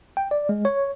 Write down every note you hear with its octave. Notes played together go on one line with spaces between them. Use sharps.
G5
D5
G#3
C#5